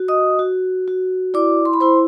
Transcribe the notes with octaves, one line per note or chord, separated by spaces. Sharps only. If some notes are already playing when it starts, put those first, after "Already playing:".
Already playing: F#4
D#5 D#6
F#4
F#4
E4 D5 D6
C6
B5
E4 C5 C6